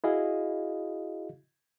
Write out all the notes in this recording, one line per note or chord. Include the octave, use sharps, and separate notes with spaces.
E4 F#4 G#4 D#5 F5